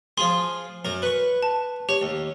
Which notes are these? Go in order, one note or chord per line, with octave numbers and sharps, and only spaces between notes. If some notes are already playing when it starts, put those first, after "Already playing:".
F3 F4 G#4 C6
F#2 A#4
B4 C#6
A5
G4 C#5
D#2